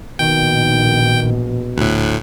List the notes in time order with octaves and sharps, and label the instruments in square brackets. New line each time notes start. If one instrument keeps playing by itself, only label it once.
[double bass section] A#1 [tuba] B2 [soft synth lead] D#3 [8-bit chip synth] G5
[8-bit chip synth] D2 A2 [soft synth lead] F#6